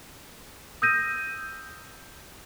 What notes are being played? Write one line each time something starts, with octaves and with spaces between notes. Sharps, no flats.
D#6 E6 G6 A#6 D#7